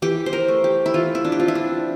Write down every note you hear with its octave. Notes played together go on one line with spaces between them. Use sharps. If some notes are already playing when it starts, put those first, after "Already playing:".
E3 G4
C5
A#4
A3
G4
E4
E3 F4
E4
D4
G4
C4 F4
E4
D4